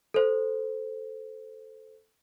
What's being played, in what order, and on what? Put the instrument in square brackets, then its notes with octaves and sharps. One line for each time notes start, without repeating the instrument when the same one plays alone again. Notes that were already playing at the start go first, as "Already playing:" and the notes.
[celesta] A4 C5